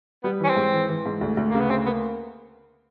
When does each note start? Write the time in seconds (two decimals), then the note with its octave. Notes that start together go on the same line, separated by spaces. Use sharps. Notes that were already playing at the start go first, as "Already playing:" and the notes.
0.24 G3 B3
0.40 E3 C#4
0.49 C4
0.56 G#2
0.73 E3
0.89 E3
1.06 G#2
1.21 D2
1.37 D2
1.50 C#3 A#3
1.60 B3
1.70 D2 C4
1.86 A#3 B3